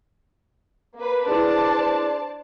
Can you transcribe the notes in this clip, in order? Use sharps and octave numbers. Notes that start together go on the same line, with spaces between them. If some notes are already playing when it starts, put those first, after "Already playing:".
A#3 B4
D4 E4 G#4 B4 C5 D5 A5